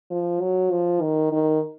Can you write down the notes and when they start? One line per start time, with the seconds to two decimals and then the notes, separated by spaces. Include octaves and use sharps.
0.11 F3
0.40 F#3
0.71 F3
1.01 D#3
1.32 D#3